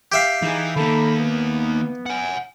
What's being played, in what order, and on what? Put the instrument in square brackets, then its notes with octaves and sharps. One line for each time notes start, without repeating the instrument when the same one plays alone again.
[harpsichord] G4 E5 F5
[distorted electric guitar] E3 [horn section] D#4 G#4
[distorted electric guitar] D#3 A#3 [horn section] A4 A#5 B5
[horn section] B3
[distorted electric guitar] F#5 G#5